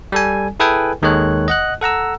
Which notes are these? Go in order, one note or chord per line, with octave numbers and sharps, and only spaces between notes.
G3 A4 G#5
E4 G#4 A4 B4 G5 G#5
D#2 D#3 G#3 A4 C#5 F#6
D#5 F#5 F#6
A4 F#5 A#5 E6